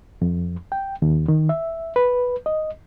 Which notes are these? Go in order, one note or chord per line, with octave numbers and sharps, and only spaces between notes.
F2
G5
D#2
D#3
E5
B4
D#5